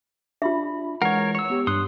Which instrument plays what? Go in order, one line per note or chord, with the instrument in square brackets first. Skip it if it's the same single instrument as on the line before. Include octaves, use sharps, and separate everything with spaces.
[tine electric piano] D4 B5 [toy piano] F4 E5
[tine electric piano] E3 G#3 [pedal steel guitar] A#4 C#5 [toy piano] F#5
[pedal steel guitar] C#5 E6
[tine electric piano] B3 G4
[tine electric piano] G2 F#6 [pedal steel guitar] C6 D#6